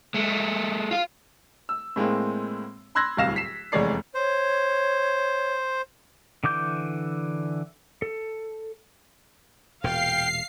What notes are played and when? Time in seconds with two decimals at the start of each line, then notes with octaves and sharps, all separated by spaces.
0.14 G#3 A3
0.91 F4 F5
1.69 E6
1.96 A2 G#3 A#3 C4
2.95 B5 C6 E6 F#6 G#6 A#6
3.17 D1 C2 F5 A#6 E7
3.36 B6 C7 E7
3.72 F1 E2 G#3 C#5 D5 C7
4.14 C5 C#5
6.44 D3 E3 D6 G6
8.02 A4
9.84 E1 A#2 F5 G5 C7